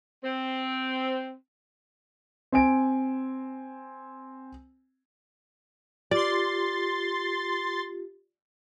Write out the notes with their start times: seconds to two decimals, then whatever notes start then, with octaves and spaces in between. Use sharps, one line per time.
0.24 C4
2.52 C4 G#5 D7
6.11 F4 G4 D5 C6 A6